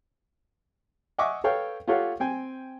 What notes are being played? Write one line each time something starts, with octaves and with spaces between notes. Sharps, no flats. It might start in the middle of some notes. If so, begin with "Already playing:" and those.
D#5 E5 F#5 G#5 C#6 D6
A4 B4 C#5 F5 G5
F4 G4 A4 C#5 F5 F#5
C4 G5 G#5